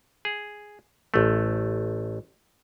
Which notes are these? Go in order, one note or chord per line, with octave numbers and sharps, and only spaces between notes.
G#4
A1 A3